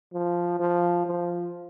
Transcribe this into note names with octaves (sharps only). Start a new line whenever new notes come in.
F3
F3
F3